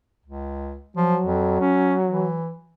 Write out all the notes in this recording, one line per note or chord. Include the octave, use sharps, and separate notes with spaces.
C#2
F3 F#3
F2
C#4
E3